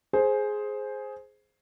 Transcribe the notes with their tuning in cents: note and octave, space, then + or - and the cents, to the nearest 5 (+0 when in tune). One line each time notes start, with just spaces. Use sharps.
G#4 +10 C5 +5